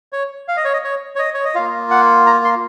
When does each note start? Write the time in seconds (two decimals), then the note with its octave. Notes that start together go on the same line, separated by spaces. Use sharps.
0.13 C#5
0.48 F5
0.57 D#5
0.64 C#5
0.73 D#5
0.84 C#5
1.15 C#5
1.19 D#5
1.34 C#5
1.45 D#5
1.55 A#3 F4 F5
1.91 F#5
2.26 A#5
2.44 C6